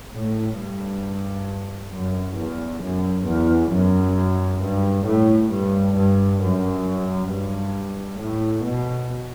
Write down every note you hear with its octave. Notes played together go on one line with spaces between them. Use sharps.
A2
G2
F#2
E2
F#2
E2
F#2
G2
A2
G2
G2
F#2
G2
A2
B2